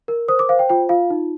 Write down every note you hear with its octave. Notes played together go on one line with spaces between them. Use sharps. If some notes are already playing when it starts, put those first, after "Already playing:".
A#4
C5 D#6
D6
C5 F5
G5
F4 G5
F4 F5
D#4